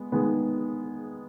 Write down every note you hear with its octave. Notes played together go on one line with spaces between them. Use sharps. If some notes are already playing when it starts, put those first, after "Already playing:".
Already playing: G#3 B3
D#3 G#3 B3